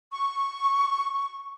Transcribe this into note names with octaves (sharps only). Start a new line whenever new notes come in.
C#6